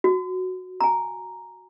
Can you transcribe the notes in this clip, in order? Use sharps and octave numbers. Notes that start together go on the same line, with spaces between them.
F#4
G#5 A#5